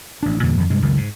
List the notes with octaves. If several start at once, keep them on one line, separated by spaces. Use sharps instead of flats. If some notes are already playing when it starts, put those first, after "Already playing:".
A1 D4
E2 G2 A#2 D3
F2 D#3
G2 C3 G#3
F#1 C#2 D#3
G#2